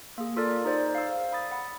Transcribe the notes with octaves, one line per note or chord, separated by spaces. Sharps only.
A#3 G#4
F4 A4 A#4 D5
D#4 G#4 C5 D5
F5 E6
B5 D#6 A6
F#5 B5